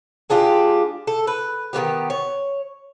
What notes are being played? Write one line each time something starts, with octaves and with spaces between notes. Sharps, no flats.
G#3 D4 F4 G4
A4
B4
D#3 F#3 B3 G4
C#5